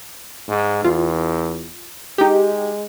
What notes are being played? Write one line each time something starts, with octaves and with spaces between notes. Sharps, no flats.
G#2
E2 F4
G#3 D#4 G4